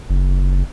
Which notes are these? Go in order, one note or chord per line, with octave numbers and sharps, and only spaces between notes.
F#1